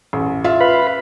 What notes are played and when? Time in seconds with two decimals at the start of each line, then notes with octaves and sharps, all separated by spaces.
0.13 A1
0.44 F4 E5
0.60 B4 F5 B5